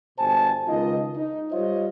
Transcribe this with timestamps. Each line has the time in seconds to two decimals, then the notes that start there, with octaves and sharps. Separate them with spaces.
0.18 G1 B2 C5 G#5 A5
0.67 C#2 D#3 D#4 F4 D#5
1.15 D#4
1.52 G3 F4 C5 C#5 D#5